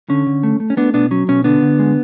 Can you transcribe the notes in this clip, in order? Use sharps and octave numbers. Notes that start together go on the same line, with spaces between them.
D3 C#4
D3
A3
A3
C#4
A3 B3 D4
B2 B3 D4
F#3 C#4
B2 C#4
D3 B3 D4
D3
G#3